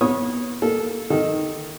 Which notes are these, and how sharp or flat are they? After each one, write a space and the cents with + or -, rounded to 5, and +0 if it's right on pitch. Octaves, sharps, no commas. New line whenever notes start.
B3 -30 C#5 -20 D#6 +0
A#3 +0 A4 -15
D#3 +0 A4 -15